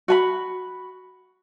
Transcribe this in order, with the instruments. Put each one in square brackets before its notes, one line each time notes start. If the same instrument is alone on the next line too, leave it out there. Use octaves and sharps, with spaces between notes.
[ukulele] F#4 G#5 B5